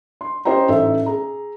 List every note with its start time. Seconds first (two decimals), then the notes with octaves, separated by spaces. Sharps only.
0.21 C6
0.45 C#4 G4 C5 D#5 G5 A#5
0.68 A1 D#4 A4 E5
1.06 G#4 A#5